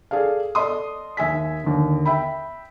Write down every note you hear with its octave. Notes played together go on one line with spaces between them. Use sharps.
G#4 A4 D5 F5
A4 D5 D#5 C6 D#6
D#2 E5 G#5 B6
D#2 D3
E5 G5 B5